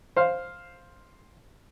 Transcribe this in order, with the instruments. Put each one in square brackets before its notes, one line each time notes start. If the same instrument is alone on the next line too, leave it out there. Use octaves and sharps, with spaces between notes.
[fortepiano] C5 F5